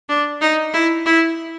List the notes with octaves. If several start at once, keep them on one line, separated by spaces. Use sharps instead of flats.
D4
D#4
E4
E4